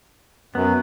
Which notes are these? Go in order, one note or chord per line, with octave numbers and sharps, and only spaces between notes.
F#2 B3